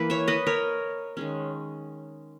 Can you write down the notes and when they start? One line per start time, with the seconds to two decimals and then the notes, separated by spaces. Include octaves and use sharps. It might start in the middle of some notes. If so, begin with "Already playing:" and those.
Already playing: E3 A#3 E4 B4
0.10 C#5 E5
0.28 B4 D#5
0.47 A#4 C#5
1.17 D#3 G#3 C#4